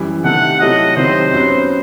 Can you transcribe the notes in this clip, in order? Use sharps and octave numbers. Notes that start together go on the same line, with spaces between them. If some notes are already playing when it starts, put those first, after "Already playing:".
Already playing: F#2 E3 G3
C3 D#3 A3 F#5
C3 F#3 A3 E4 D#5
C3 D#3 F#3 C4 C5
F#2 F#3 B3